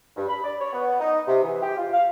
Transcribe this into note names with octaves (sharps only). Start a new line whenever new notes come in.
G2
B5
D5
C#5
B3
D#4
C3
E3
G4
F4
F5